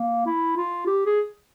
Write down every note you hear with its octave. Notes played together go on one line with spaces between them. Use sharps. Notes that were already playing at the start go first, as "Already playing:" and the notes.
Already playing: A#3
E4
F4
G4
G#4